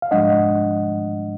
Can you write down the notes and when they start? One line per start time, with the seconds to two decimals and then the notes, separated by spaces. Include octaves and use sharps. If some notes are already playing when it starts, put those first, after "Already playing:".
0.02 F5
0.11 G#2 F3 G#3 D4 D#5 F#5